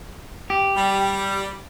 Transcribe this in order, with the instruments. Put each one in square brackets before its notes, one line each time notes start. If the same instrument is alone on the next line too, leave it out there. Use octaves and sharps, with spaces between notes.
[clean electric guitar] G4
[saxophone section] G3